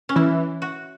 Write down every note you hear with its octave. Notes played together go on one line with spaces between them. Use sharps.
C#4
E3 E4
F#4